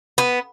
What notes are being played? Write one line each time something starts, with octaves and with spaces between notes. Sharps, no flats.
B3